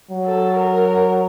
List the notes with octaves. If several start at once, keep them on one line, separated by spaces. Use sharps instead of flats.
F#3
A4
A#4